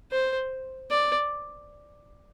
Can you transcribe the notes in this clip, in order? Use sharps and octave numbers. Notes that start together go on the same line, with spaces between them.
C5
D5